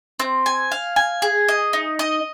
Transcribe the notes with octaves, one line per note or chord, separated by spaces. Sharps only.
C4
G#5
F5
G#5
G#4
D#5
D#4
D#5